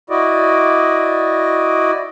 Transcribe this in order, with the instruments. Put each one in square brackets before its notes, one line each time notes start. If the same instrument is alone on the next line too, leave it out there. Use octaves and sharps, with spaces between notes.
[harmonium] E4 F#4 D5 D#5